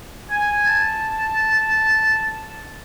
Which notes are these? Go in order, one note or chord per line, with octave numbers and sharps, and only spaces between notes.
G#5
A5